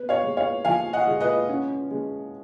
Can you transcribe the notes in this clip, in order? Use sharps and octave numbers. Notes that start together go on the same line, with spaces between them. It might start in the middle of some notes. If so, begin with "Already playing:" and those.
Already playing: B3 B4
C#5 F5
G#3
C#5 F5
F3 F5 G#5
D#5 F#5
G#3
B4 D#5
C#4
G#3